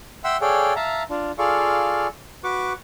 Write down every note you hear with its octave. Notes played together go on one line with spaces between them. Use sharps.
E5 F#5 G5 C6 E6
G#4 A4 C#5 D5 F5 G5
E5 F5 A5 A#5
D4 F4
F4 G#4 A4 D5 F5 C#6
F#4 B4 C#6 D6